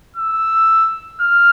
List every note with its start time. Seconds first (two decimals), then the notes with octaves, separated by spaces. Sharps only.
0.16 E6
1.21 F6